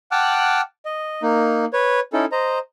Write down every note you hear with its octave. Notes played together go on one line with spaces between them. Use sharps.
F#5 G5 A5 D6 F6 F#6
D#5
A#3 D#4
B4 C#5
C#4 D#4 E4 A4
C5 D#5 A#5